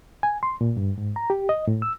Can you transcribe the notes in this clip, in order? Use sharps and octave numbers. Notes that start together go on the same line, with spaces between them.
G#5
C6
A#2
G2
G#2
A#5
G4
D#5
A2
E6